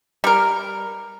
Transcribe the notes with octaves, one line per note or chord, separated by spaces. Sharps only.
G3 A#4